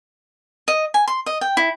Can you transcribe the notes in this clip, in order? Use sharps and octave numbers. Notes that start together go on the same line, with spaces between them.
D#5
G#5
C6
D#5
G5
E4